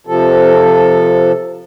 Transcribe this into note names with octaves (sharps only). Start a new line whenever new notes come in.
C3 F3 A4